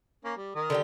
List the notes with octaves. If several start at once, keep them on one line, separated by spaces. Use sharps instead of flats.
A#3 C#4
G3
D#3 A#4 D#6
D3 G3 G4